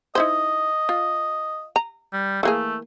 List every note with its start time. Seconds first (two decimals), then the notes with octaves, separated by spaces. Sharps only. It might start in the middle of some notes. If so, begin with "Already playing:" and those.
0.15 D#4 E4 C5 D#5
0.89 F4
1.76 A#5
2.13 G3
2.43 E3 A3 A#3 G#4